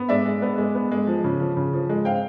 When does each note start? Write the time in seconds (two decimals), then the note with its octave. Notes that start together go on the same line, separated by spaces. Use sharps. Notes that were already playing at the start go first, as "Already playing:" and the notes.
Already playing: B3
0.09 G#3 D5 E5
0.25 G#3
0.42 B3
0.58 G#3
0.75 B3
0.91 G#3
1.07 F3
1.24 C#3
1.40 F3
1.57 C#3
1.73 F3
1.89 G#3
2.05 C4 F5 G5